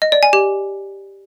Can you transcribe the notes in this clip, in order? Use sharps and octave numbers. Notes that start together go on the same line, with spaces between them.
D#5
D5
G#5
G4